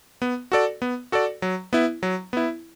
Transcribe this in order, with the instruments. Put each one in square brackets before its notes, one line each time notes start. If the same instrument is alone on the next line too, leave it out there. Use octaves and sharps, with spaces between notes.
[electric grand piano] B3
F#4 A4 D5
B3
F#4 A4 D5
F#3
B3 E4
F#3
B3 E4